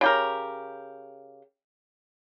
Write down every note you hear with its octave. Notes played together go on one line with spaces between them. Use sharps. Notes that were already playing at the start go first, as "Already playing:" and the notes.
C#3 G4 A#4